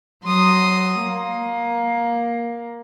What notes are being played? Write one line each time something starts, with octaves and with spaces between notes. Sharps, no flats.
F#3 C6 D#6
A#3